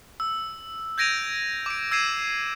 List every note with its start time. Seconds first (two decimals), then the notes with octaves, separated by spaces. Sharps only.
0.20 E6
0.98 G6 G#6 A#6 D7 D#7 F7
1.66 D6 D7
1.91 E6 G#6 C7 D#7 E7